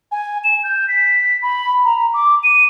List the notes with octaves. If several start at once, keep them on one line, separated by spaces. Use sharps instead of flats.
G#5
E7
G6
B6
B5
A#5
D6
D#7